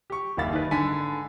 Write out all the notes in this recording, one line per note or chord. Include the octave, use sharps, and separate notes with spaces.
G4 C#6
F#1 D#2 E5 F5 B5 A6
D#3 B4
G#2 D3 A4 G#5 B5 B6